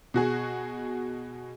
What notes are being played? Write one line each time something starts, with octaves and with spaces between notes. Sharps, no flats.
B2 F#4 G#4